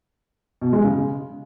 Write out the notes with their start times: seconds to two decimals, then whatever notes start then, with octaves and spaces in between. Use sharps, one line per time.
0.62 B2
0.73 G#3
0.84 C#3